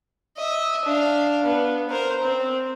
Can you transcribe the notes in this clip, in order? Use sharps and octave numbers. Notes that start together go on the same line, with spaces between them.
D#5 E5
D4 F5
B3
A#4 C5
C4